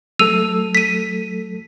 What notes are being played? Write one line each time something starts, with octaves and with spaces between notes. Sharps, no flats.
F#3 A3 A4 E6 D#7 F7
B6 D#7